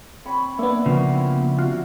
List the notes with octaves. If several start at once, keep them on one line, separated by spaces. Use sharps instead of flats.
C4 C#5 B5
A#3 B3 D4 E4 E5
C#3 F3 C4 F#4 A#4
F4 F#4 F5 F#5